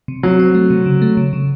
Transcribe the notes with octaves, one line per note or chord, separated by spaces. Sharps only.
C3
F#3 C4
C4
A3
C3
C#3
A3
C#3
C#3